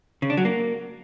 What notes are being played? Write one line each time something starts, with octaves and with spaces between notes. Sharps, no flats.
C#3
D4
F#3
A#3